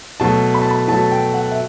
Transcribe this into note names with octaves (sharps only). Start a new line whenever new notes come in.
B2 F#3 A3 A5
B5
A5
B5
B2 F#3 A3 A5
A5
G5
F#5
E5